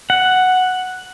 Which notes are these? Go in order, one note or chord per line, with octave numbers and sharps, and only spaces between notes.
F#5